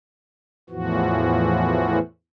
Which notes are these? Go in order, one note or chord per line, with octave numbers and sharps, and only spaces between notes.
E2 A2 E3 F3 F#4